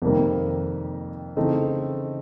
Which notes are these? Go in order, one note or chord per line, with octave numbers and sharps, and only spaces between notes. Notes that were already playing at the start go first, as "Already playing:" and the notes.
F2 C3 D#3 G3 A#3
C#3 E3 A3 C4 D#4